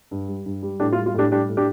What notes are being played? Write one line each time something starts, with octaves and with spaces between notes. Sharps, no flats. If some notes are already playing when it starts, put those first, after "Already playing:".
G2
G3
G2
G3
A2 D4 G4
F4
G3
F4
A2 D4 G4
G3 D4 G4
A2
D4 G4